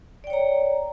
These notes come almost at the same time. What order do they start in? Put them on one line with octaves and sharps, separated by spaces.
D5 G5 C#5 A#5